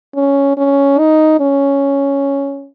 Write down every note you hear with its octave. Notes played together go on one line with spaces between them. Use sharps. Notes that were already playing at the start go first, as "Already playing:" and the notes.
C#4
C#4
D#4
C#4